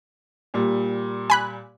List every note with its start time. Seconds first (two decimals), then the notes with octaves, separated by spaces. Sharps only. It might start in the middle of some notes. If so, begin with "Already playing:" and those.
0.54 A#2 G3
1.30 G#5 B5 F#6